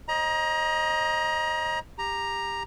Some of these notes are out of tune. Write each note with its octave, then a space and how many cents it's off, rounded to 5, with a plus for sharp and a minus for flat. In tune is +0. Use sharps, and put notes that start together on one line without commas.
C5 +40 D#5 +0 A#5 +25
G4 +20 A#5 +0